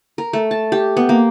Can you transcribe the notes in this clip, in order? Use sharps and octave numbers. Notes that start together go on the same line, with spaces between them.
A#4
A3
A5
G4
B3
A#3